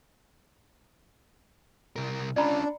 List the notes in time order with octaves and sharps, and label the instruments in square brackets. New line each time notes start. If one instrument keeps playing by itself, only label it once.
[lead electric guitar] C2 A#4
[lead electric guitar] C#4 F4 [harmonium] D4 [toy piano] D5 A#5 B5